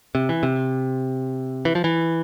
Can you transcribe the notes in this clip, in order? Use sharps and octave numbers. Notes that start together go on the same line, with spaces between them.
C3
E3
C3
E3
F3
E3